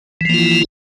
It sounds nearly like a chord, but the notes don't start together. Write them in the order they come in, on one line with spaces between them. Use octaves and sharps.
E3 F3 A#3 F4 E4